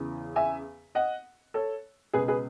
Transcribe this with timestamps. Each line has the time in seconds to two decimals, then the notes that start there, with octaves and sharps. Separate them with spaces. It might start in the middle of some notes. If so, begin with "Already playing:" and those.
Already playing: E2 C#3 E3
0.36 E5 G#5
0.95 D#5 F#5
1.54 A4 C#5
2.13 C#2 B2 G#4 B4
2.28 G#4 B4